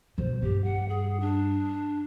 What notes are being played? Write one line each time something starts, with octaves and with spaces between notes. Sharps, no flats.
E2 B2 C5
G2 G4
F#5
G#4
D4